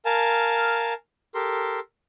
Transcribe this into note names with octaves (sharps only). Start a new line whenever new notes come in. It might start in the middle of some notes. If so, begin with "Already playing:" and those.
A#4 F5 G#5 A5
G4 A4 A#4 C6